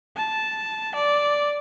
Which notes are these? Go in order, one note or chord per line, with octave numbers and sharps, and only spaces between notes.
A5
D5